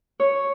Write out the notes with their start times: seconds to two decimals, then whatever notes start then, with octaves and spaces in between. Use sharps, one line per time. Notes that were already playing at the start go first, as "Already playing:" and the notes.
0.20 C#5